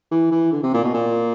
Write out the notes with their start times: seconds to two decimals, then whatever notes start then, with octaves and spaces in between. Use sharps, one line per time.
0.11 E3
0.31 E3
0.52 D3
0.63 C3
0.74 A#2
0.84 B2
0.94 A#2